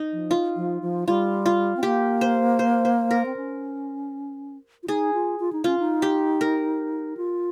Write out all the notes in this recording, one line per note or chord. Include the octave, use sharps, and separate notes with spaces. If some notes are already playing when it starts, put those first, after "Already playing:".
Already playing: D#4
F3
F4
F3
F3
G3 F4
F4
C4
A#3 G4
C5
C5
C5
A#4
C4
C#4
F4
D#4 G#4
F4
F4
D#4
C#4 F4
D#4
G4
A#4
F4